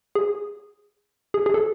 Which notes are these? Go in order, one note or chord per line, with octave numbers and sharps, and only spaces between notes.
G#4
G#4
G#4
A4